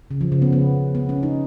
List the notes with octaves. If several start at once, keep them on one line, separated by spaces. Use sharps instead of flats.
C#3
F3
C#3
B3
B3
B3
C#4
D#4